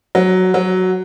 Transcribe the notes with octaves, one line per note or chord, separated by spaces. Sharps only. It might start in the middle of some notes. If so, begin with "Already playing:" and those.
F#3
F#3